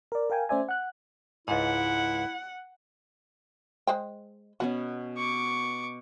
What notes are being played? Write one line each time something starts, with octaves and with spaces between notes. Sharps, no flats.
A#4 D5
A#4 F5 G5 G#5
A3 C#4 C5 D5 E5 G#5
F#5 F#6
C#2 G#2 E4 F#5
G#3 C5 G5
B2 B3 C#4 F#4
C#6 D6